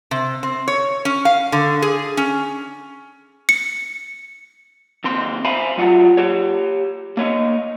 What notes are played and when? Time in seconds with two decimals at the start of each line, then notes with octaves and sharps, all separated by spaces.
0.11 C3
0.43 C4
0.68 C#5
1.05 C#4
1.25 F5
1.52 D3
1.82 G#4
2.17 C#4
3.49 C#7
5.04 D#2 C4 C6
5.45 C5 E5 F5 G#5 A#5 B5
5.78 F#3 G3 F4 F#5
6.17 G4 C#5
7.17 A#3 C#5 D#5